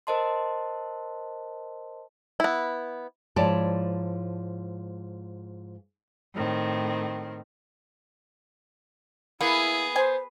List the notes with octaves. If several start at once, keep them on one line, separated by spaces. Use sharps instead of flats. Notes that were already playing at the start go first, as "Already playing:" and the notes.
A#4 C5 D#5 A5 C6
B3 E4
G#2 F3 E4 C#5 D5 A5
A2 D#3 C4
A#3 B3 E4 G#4
C5 G#5